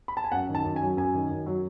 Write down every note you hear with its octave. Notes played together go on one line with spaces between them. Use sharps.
B5
A5
G#5
F#2 F#5
D#3
A5
F#2
G#5
F#3
F#2 G#5
D#3
F#2
F#3